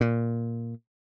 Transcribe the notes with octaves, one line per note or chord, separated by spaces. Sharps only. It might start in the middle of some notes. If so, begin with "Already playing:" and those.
A#2